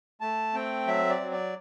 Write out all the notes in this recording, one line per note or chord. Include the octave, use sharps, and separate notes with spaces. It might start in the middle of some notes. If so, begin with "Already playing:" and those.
A3 A5
C4 G5
F#3 E5
D5
F#3
D5